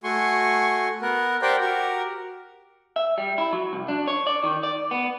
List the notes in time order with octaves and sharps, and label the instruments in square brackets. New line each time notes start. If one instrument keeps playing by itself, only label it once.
[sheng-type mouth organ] A3 F#4 G#5 C6 C#6
B3 A#4 F#5
G4 A#4 C5 D5 F#5 G5
F#4 G4 A#4
[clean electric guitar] E5
G3
E4
F#3
C2
D4
C#5
D5
D#3
D5
B3